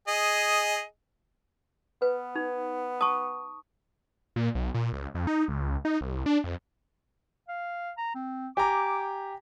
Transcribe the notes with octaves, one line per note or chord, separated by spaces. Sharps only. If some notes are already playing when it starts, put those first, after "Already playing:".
G#4 D#5
B3 B4
D#4
A5 C#6 D#6
A#2
B1
A#2
C#2
F2
D#4
C#2
D#4
C2
D4
F2
F5
A#5
C4
G4 G#5 A#5 D6